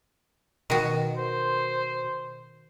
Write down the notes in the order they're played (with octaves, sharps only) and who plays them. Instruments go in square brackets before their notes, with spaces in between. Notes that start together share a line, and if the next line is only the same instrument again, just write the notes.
[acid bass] B2 [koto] D#3 F#4
[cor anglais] C5